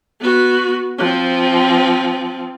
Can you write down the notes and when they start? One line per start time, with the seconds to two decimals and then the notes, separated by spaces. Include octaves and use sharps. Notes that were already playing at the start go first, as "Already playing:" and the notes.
0.21 B3 F#4
0.99 F3 C4